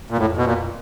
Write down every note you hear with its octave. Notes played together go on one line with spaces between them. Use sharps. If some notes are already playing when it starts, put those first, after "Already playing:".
A#2
F2 A2
B2
A#2